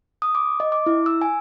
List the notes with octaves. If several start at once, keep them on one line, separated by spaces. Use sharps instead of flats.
D#6
D6
D#5
D6
E4
E6
G#5